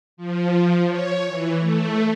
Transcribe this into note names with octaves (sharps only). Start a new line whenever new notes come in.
F3
C#5
E3
A3